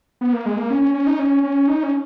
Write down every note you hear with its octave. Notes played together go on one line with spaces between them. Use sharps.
B3
A#3
G#3
A#3
C#4
C#4
C#4
D#4
C#4
C#4
D#4
C#4